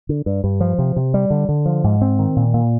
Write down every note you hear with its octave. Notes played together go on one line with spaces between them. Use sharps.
D3
G2
G2
F3
C3
C3
G3
D3
D3
F3
G#2
C4
D#3
A#2
A#2